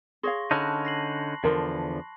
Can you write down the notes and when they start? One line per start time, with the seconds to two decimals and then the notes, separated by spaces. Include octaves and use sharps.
0.23 G#4 C#5 F5 C6 C#6 A#6
0.51 D3 C#4 D#4 A5 B5 F#6
0.85 A#6 C7 F#7
1.44 E2 D3 F3 A#4